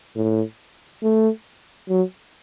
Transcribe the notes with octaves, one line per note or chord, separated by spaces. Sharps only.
A2
A3
F#3